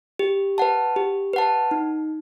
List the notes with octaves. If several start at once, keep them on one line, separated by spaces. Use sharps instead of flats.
G4
B4 F#5 A5
G4
B4 F#5 A5
D#4